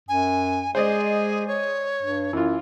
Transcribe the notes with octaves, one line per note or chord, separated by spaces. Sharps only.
F#2 G#5
G#3 G#4 C5 D5 D#5
C#5
G2
F#2 E3 F4